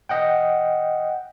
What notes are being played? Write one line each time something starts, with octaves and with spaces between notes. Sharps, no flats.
D#5 F#5 G5